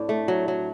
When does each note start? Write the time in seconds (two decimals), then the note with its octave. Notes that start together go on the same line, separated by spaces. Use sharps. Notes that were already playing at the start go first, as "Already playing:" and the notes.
Already playing: A2 C4 D4
0.09 A3
0.28 F#3
0.48 F#3